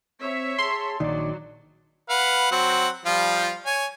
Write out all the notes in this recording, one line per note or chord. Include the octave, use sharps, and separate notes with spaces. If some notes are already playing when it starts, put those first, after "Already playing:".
C4 C#5 E5
G#4 A5 C6
A#1 D#3 F#3 D5
B4 F5 F#5
F#3 C4 F#5
F3 G3 F4
C#5 G#5